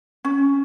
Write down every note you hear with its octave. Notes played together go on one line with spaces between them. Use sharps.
C#4